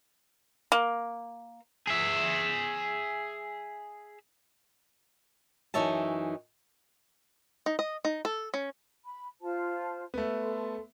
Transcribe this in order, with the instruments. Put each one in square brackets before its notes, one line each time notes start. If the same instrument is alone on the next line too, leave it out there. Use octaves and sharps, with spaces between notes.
[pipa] A#3
[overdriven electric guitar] G#4 E5
[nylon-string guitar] F#2 E3 D#4 C#5 E5 A5
[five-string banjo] D#4
D#5
D#4
A4
C#4
[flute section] B5
F4 C5 A5
[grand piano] A3 B3
[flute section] A4 C6